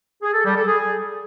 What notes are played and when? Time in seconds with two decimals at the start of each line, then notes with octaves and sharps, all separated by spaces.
0.22 G#4
0.33 A4
0.45 G3
0.56 A4
0.67 G#4